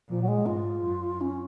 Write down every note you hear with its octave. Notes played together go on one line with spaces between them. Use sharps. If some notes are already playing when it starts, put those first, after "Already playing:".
A#2 F3
F#3
G#3
G#2 F4
F#2
C#4